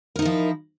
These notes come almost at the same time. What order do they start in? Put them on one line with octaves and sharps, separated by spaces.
A#4 D#4 E4 F3